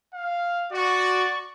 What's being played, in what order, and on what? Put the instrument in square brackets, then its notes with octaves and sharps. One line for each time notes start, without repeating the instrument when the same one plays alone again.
[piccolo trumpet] F5
[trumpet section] F#4 [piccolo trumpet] D5 [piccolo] C#6